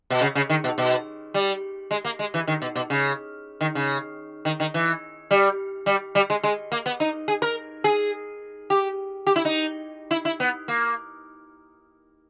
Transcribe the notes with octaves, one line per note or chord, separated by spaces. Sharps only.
B2
C#3
C#3
D#3
B2
B2
G3
G#3
A#3
G#3
E3
D#3
B2
B2
C#3
D#3
C#3
D#3
D#3
E3
G3
G3
G3
G#3
G#3
A#3
B3
D#4
G#4
A#4
G#4
G4
G4
E4
D#4
E4
E4
B3
A#3